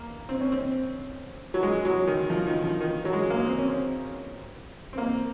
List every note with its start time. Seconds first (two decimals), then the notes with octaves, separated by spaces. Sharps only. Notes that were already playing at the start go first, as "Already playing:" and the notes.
Already playing: A#3
0.29 C4
0.40 C#4
0.52 C4
1.54 F#3
1.63 G#3
1.85 F#3
2.07 D#3
2.30 F3
2.46 D#3
2.63 F3
2.80 D#3
3.05 F#3
3.13 G#3
3.30 A#3
3.46 C4
3.58 C#4
3.63 C4
4.93 C4
4.98 A#3